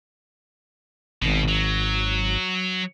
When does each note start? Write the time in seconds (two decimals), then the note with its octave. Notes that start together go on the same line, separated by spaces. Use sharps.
1.22 G#1 B2
1.49 F#3